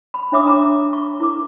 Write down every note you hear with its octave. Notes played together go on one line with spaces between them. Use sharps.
B5
D4 C#5 E5 D6 D#6
D4 A#5 B5 D6
C#6
E4 A#4 D6